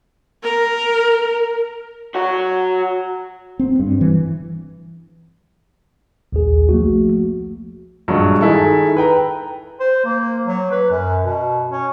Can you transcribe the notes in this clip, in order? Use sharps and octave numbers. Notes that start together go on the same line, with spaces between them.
A#4
F#4 C#5
C4
G2
E3
A#1 D#2 G#4
F3 A3 A#3 F#4
A#1 G2 F#3 G#3
D#3 E4 G#4 A4
B4 G5 A#5
C5
A#3
F#3
B4
F#2
B2
C#4